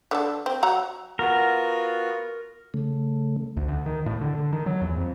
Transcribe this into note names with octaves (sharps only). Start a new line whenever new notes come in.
D3 D4 A4
C4
F#3 F#5 A#5
B3 F4 F#4 A#4
C#3 A3
D2
D2
D#3
A2
D3
D3
D#3
F#3
E2
F2